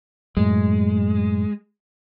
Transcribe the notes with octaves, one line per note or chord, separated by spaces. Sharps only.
F#2 A2 G#3